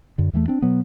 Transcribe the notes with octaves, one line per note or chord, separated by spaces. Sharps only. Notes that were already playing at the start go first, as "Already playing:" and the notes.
F#2 D3
E2 E3 G3 A3
C4 D4
B2 F#3 B3